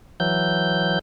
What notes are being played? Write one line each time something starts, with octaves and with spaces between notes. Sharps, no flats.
E3 F#3 G6